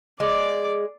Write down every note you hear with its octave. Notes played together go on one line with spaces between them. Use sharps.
G#3 D5 D6